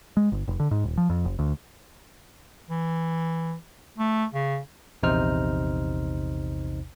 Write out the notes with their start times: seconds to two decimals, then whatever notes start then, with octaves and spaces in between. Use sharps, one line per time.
0.17 G#3
0.32 G1
0.48 F1
0.60 D3
0.71 G#2
0.84 D#1
0.97 F3
1.10 F2
1.25 F#1
1.39 D2
2.70 E3
3.98 A3
4.34 C#3
5.03 A#1 E2 C3 D#4 C5 F6